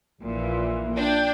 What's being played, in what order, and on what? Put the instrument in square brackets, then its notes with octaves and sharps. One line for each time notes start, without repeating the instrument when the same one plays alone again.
[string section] A#1 A#2 E3
[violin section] D4 [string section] G5